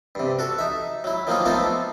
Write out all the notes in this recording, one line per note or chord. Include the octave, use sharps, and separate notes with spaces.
G2 C3
F#4 A4 C#6
D#4 E5
F#3 E4
D#3 F3 F#3 A#3 D#4 F4
F3 A3 B3 C4 D#4 A4